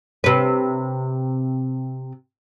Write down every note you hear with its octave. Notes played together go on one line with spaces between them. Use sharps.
C3 B4